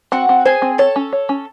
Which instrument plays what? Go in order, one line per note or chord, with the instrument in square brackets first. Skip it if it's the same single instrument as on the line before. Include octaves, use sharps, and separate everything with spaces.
[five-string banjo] C4 [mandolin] F#4 F#5
[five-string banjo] C4
[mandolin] G#4 G#5 [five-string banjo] C5
[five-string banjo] C4
[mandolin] A4 A5 [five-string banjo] C#5
[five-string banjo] C#4
C#5
C#4